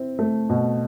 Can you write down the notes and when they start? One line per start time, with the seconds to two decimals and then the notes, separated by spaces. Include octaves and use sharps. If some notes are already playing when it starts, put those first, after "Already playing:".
Already playing: C4 E4
0.19 A3
0.49 B2